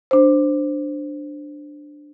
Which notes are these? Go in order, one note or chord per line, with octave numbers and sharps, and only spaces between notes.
D4 C5